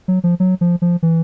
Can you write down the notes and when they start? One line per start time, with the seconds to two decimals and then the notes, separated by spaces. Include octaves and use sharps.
0.08 F#3
0.24 F3
0.40 F#3
0.61 F3
0.82 F3
1.03 E3